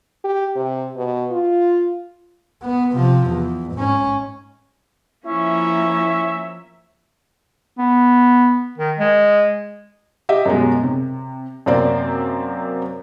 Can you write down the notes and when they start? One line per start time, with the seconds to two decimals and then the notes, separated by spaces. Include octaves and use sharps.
0.24 G4
0.56 C3
0.96 B2
1.31 F4
2.62 B3
2.93 C3 F3
3.27 E2
3.74 G#2 C#4
5.26 F3 A#3 C#4 E4 E5
7.78 B3
8.78 D#3
8.99 G#3
10.29 G4 D#5 E5
10.46 F#2 B2 G#3
10.83 C3
11.66 F#2 C3 A#3 C4 C5 D5